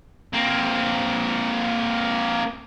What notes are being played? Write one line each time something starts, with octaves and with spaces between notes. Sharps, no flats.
A#3 C4